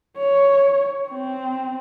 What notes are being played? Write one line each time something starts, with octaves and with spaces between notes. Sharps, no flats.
C#5
C4